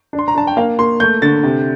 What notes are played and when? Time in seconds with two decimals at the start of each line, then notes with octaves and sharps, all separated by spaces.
0.13 D4
0.19 C6
0.28 A#5
0.35 D4 A5
0.47 G5
0.57 A#3 F5
0.79 A#3 C6
1.00 A3 G6
1.22 D3 A6
1.44 C3